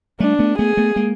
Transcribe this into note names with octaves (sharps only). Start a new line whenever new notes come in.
G3 A3 D4
A3 B3
A3 B3 G#4
A3 B3
G#3 A#3